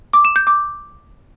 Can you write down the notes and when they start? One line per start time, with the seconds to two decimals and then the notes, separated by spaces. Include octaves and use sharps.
0.13 D6
0.25 E7
0.36 G6
0.47 D6